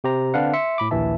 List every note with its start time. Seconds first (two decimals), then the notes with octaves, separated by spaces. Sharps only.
0.04 C3 G4 C5 A#5
0.34 D3 C4 D4 B4 F5 F#5
0.54 E5 C6 C#7
0.78 A2 B5 D6
0.91 A#1 D#2 E3 E5 A5